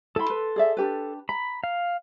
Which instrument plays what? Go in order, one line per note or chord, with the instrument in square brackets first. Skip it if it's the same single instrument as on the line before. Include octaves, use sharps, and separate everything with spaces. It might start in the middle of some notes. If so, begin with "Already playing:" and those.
[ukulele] E4 B5 [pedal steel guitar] A4 C6
[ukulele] B4
G#4 D5 E5
D4 G4 B4
[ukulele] A#5 [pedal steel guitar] B5
[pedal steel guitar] F5